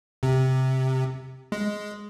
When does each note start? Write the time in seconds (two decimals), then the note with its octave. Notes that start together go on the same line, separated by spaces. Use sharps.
0.23 C3
1.52 G#3